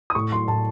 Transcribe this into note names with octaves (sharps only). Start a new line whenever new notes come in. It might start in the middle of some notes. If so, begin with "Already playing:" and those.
D#6
A2 C#6
F#3 C6
A2 A5